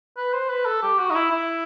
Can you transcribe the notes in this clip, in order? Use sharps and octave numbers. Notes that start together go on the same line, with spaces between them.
B4
C5
B4
A4
G4
F#4
D#4
E4
E4